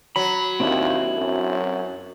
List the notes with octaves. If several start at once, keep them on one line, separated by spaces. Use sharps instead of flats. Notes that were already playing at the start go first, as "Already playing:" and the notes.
F#3 B5
D#2 C4 D4 E4
F#2